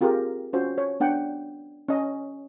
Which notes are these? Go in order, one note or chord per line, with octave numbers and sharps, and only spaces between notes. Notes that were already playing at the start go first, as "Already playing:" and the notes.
C4 F4 G4 G#4 A#4
C#4 F4 F#4 C5
C#5
B3 D4 F#5 G5
C#4 D#5